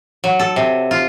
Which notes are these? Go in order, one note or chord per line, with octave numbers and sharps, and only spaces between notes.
F#3
A4
C3
F4